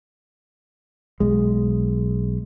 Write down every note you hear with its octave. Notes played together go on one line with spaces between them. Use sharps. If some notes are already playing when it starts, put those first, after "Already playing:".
B1 G#3